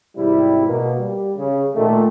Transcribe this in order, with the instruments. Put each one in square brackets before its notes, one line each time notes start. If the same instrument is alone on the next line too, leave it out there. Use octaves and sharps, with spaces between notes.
[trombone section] G#1 C3 G3 E4
B2 A#3
G3
C#3
A#2 D#3 A3